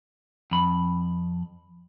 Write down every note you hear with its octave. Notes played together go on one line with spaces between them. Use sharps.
F2 B5